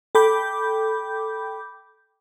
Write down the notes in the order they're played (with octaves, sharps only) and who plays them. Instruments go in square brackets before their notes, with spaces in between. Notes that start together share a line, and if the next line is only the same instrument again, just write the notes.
[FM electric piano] A4 G5 B5 D6 G6